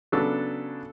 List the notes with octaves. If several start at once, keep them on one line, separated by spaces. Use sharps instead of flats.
C#3 F#3 B3 D4 A4